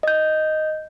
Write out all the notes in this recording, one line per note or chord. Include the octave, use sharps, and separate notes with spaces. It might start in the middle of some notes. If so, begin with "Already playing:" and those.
D#5 G6